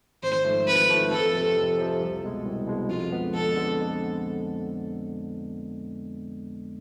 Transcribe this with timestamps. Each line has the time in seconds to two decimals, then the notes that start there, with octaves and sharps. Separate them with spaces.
0.22 G#1 C5
0.44 G#2 F3 A3
0.67 G#1 B4
0.90 G#2 F3 A3
1.11 F2 A4
1.33 C3 F3
1.56 F2
1.78 C3 F3
2.01 C2
2.23 B2 G#3
2.44 C2
2.67 B2 G#3
2.89 F2 F4
3.12 D3 G#3 B3
3.34 F2 A4
3.56 D3 G#3 B3